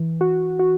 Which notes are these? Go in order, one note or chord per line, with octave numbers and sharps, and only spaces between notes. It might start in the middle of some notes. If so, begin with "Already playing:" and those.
Already playing: E3
F#4
F#4